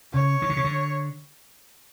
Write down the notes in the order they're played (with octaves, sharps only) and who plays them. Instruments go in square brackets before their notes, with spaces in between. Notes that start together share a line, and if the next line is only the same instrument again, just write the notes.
[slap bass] C#3 [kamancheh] C#5
[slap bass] D#3
D3
C#3
D3